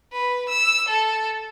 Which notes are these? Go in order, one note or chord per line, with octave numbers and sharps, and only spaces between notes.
B4
E6
A4